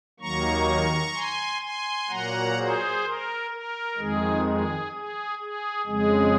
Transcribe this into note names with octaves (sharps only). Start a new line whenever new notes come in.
D#2 D#3 F#3 A#3 A#5 C#6
G#5 C6
G#5 C6
A#2 F#3 A#3 F#5 A#5
G#4 C5
A#4
A#4
F2 D#3 G#3 G#4
G#4
G#4
G#4
F2 C#3 G#3 G#4